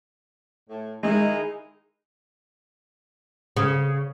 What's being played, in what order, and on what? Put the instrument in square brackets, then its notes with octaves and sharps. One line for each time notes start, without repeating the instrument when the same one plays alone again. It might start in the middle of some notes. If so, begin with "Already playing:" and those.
[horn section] A2
[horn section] D#3 D#4 E4 [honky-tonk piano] G#3
[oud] C#3